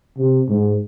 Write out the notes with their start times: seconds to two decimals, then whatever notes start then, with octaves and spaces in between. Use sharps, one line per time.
0.18 C3
0.49 G#2